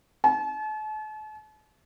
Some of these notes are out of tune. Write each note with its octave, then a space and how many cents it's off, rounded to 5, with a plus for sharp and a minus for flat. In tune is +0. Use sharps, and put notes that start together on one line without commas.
A5 -40